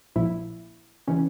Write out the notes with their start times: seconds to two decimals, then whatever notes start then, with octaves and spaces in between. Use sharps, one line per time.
0.16 A#1 A#2 F3 E4
1.08 C#3 E3 C#4